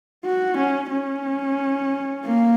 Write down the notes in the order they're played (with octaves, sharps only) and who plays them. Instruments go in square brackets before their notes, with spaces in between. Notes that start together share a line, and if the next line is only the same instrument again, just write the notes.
[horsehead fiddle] F#4
C#4
C#4
A#3